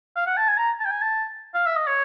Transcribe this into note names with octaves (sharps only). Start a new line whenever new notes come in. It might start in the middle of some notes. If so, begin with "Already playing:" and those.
F5
F#5
A5
G#5
A#5
A5
G5
G#5
A5
F5
E5
D#5
C#5